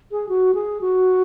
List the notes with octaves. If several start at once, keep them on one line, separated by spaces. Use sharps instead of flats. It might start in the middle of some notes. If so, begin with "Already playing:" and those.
G#4
F#4
G#4
F#4